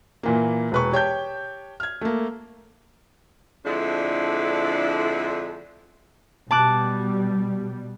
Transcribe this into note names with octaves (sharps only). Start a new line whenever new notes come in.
A#2 E3 A#3
E1 B4 C#6
G4 C#5 G5 A5 G6
F6 G#6
A3 A#3
F2 D3 G#3 D4 E4
B2 G3 A5 D6 F#6